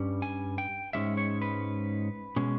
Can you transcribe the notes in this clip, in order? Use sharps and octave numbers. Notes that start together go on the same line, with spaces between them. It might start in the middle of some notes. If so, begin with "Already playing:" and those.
Already playing: G2 G3 C#4
G#5
G5
G#2 D#3 G#3 C#4 E5
C#5
B4
B2 G#3 C#4